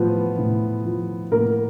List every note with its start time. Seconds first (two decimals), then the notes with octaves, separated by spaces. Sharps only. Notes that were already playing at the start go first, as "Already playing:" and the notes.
Already playing: A2 F3 B3
0.39 A2
0.85 F3
1.31 A2 A#3 A#4